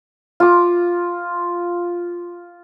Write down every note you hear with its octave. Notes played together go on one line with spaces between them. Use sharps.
F4 D6